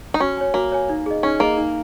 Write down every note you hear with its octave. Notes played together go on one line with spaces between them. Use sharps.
D#4
C#4 F#4
C#5 G#5
A#3 F#4
C#5 G#5
D#4
G#4 D#5
C#4 D#4
A#3 G#4 D#5
D#4